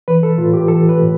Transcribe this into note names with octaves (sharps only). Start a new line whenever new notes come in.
E3 B4
A4
A2 F4
G4
E3 A4
B4
A2